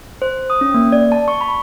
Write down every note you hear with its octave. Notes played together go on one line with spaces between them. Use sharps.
C5
D#6
C#4
A#3
D5
A5
C#6
B5